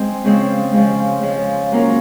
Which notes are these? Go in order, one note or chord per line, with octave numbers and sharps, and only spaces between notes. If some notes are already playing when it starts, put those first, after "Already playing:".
Already playing: G#3 C4
C#3 F3 G#3 C4
C#3 F3 G#3
C#3 F3 G#3
F#3 A#3 C#4 F4 A#4